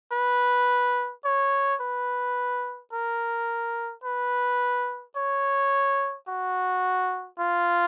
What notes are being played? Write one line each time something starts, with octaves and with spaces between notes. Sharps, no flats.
B4
C#5
B4
A#4
B4
C#5
F#4
F4